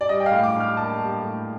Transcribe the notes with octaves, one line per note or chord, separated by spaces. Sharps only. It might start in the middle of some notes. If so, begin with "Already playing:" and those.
D5
G3 D#5
G5
F5
A2
D6
D4
F6
A#3 A5
G3 A5
A2